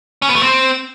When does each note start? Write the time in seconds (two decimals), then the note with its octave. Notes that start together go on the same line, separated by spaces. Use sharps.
0.22 C#4
0.29 B3
0.36 A3
0.43 C4